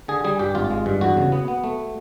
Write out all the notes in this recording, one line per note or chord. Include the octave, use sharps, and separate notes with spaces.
D3 G#4
G3 G#4
G2 G4
G#1 F4
G#3
G2
E2 F#4
C#3
B3
B3
A3